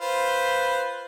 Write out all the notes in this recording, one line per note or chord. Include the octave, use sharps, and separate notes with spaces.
F4 B4 C5